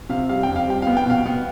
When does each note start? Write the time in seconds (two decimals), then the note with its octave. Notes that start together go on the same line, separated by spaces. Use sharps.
0.09 C3 F5
0.29 G3 F5
0.43 G5
0.48 F2
0.56 F5
0.67 G3 G5
0.82 B3 F5
0.97 G5
1.06 B2 F5
1.26 B3